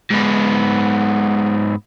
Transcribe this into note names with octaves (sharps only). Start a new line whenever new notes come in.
G#2 B3